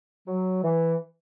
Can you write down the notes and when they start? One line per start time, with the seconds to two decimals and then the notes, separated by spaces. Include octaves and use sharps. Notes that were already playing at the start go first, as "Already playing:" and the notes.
0.27 F#3
0.63 E3